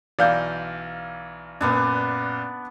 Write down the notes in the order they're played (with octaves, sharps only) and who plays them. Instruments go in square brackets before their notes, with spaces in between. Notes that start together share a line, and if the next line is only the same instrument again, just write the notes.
[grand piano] B1 E3 [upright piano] D5 F5 G6
[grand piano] F#2 A#2 [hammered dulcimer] B3 D4